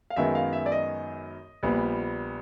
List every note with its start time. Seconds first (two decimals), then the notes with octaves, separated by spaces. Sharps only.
0.10 F5
0.16 F#2 D#3 G#3 B3 E5
0.35 F5
0.53 E5
0.66 D5
0.72 D#5
1.63 A#1 A#2 G3 B3